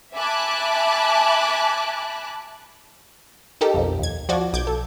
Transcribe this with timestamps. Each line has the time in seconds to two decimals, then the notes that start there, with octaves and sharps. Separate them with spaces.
0.14 E5 G#5 A5 B5 D6 F#6
3.61 D#4 G4 A4 A#4
3.74 B1 F2
3.99 D#2 G#6
4.29 F3 F#4 D5 G#6
4.53 B1 D6 G6 G#6
4.67 A4